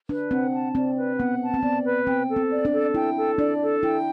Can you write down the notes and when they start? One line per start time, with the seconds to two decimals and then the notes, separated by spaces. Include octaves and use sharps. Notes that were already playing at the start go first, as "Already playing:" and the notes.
0.09 D4 B4
0.31 C4 F#5
0.53 A5
0.75 C4 D5
0.97 B4
1.19 B3 F#5
1.41 A5
1.54 C4
1.63 B3 D5
1.84 B4
2.07 C4 G5
2.29 A4
2.36 C4
2.51 D5
2.65 D4
2.73 A4
2.94 E4 G5
3.17 A4
3.38 D4 D5
3.60 A4
3.83 E4 G5